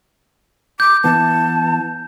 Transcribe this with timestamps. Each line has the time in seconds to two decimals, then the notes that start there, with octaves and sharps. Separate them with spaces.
0.80 D6 G6
1.04 E3 B3 A5